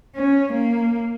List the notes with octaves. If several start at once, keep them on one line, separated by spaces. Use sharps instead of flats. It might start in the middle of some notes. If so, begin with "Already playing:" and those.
C#4
A#3